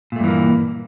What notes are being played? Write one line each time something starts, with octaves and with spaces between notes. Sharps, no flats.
G2 A#2 E3 A3 A#3